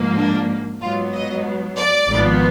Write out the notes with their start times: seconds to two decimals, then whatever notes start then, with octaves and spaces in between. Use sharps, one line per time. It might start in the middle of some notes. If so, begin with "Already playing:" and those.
Already playing: G#2 F3 A#3
0.16 D4
0.81 G#2 F#3 B3 F4
1.13 D#5
1.77 D5
2.10 G#1 G#2 F3 B3